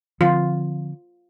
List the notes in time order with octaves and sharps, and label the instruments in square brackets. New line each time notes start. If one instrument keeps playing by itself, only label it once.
[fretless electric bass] D3 F3 C4 [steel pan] F4